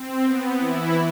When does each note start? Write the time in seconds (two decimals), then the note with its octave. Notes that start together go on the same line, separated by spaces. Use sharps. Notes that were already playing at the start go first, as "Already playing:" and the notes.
Already playing: C4
0.25 B3
0.59 E3 E4